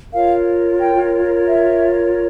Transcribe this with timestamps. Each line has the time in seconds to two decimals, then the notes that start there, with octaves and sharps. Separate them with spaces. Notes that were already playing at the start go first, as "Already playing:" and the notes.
0.12 F4 A#4 C#5 F5
0.80 G5
1.47 E5